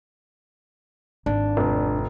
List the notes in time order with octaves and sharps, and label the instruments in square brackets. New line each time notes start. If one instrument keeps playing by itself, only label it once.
[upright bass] G#1 [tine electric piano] D4
[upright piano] F1